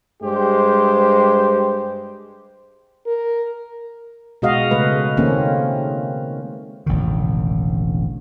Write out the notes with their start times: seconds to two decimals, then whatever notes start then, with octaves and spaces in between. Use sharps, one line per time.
0.23 G2 G#3 G4 C5
3.06 A#4
4.42 B2 G#3 F#4 D#5 F5
4.71 C#3 G#3 A3 B4
5.17 D#3 A3 A#3 C4 C#4
6.86 E1 A1 D3 D#3